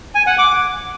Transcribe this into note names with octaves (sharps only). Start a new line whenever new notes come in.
G#5
F#5
D6